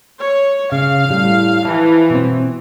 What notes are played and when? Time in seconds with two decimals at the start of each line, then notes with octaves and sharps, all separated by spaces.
0.20 C#5
0.72 C#3 F5
1.08 A2 G3
1.65 E3 F3 A5
2.10 B2 C4